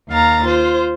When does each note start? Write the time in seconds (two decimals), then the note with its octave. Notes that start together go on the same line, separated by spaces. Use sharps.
0.11 D#2 F5 A#5 A6
0.44 F4 C5